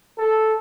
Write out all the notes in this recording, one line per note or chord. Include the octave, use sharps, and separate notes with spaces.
A4